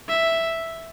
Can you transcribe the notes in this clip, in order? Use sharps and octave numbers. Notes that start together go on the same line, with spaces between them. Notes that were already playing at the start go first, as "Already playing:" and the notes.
E5